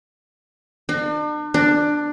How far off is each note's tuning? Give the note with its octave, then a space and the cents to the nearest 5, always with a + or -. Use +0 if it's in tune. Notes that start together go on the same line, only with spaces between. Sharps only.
D4 +40
D4 +10